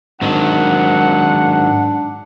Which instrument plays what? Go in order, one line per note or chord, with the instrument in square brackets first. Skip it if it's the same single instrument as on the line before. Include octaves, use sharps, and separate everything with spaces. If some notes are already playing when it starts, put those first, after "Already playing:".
[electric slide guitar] G#2 D#3 F#3 [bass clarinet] D4 [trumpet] F#5